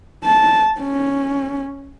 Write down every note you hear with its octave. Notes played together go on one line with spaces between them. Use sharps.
A5
C#4